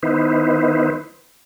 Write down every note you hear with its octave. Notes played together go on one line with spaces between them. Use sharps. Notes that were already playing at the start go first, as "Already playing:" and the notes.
D#3 B3 D#4 E4 B4 C5